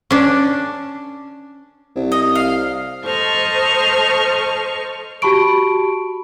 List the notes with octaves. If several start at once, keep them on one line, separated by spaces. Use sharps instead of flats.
C#4 D4
C2
D#5
F5
A4 C5 D#5 C#6 F6
F#4 G4 A5 B5 C#6 D7